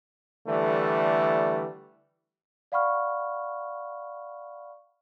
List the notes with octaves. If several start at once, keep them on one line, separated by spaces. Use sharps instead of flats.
D3 E3 G3 A3
D5 F5 F#5 B5 C#6 F6